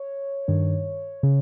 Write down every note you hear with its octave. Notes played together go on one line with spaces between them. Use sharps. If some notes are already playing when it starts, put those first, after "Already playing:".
Already playing: C#5
G2 D#3
C#3